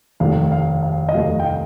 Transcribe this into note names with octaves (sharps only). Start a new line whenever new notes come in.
F1 D#2 D#3 A3 F5
F5
F5
D#5
F1 D#2 D#3 A3 F5
G5
F5